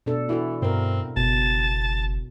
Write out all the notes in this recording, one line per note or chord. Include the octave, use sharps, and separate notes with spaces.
B2 D4 A4
E3 E4 F#4 A4
G2 B2 C4 A#4
F#1 B2 A5